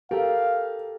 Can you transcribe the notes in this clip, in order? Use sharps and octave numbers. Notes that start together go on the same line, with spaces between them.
G4 A4 A#4 F5